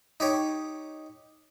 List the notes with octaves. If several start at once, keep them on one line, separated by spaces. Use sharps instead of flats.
D#4 G4 C#5